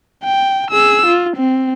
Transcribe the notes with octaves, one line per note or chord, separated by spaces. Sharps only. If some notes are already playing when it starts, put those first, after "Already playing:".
G5
G#4 E6
F4
C4